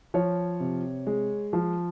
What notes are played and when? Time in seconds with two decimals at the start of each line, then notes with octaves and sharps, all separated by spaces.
0.14 F3 C#5
0.60 C3
1.07 G#3
1.53 F3